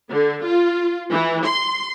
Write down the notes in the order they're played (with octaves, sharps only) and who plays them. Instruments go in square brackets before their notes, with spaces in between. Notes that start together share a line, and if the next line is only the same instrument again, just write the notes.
[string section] D3
F4
E3
C6